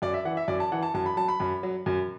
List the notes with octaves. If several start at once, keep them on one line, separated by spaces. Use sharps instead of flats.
F#2 D5
E5
E3 F#5
E5
F#2 D5
A5
E3 F#5
A5
F#2 A5
B5
F#3 A5
B5
F#2
F#3
F#2